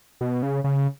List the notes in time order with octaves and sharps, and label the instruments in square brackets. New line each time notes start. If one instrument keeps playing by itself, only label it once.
[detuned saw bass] B2
C#3
C#3